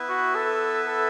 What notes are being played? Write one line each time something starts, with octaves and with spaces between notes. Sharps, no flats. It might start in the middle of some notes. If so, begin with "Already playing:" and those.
Already playing: B3 E4 B4 E5
F#4
A4
A4